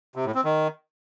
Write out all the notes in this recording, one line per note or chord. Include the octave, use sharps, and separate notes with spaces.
C3
A2
C4
D#3